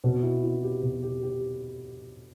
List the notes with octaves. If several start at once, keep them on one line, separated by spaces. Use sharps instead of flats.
B2
E4
E4
G4
B2
G4
G4